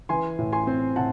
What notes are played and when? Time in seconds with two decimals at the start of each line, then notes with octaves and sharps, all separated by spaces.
0.09 E3 G#5 C6
0.39 A2
0.53 G#5 C6
0.67 C4
0.96 A2 F#5 A5